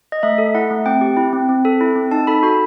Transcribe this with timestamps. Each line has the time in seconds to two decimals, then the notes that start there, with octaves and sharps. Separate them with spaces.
0.12 D#5
0.23 A3 E5
0.38 A4
0.55 E4 F#5
0.71 A3
0.86 C4 G5
1.01 G4
1.17 E4
1.33 C4
1.49 C4
1.65 A4
1.81 E4
1.96 C4
2.11 D#4 A5
2.27 A4 B5
2.43 F#4 B5